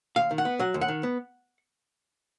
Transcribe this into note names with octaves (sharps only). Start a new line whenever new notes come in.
D#2 F5
D#3
F#5
B3
F#3 F#5
D#2
F#5
D#3
B3